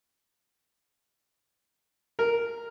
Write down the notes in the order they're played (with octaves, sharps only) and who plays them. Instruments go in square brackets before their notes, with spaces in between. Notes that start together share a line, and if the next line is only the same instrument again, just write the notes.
[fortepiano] A#4